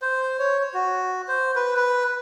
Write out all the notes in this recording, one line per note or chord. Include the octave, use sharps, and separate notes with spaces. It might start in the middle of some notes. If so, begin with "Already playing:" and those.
C5
C#5
F#4
C5
B4
B4